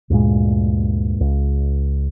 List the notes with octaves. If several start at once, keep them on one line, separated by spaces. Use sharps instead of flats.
D2 G2 A#2 G#3
C#2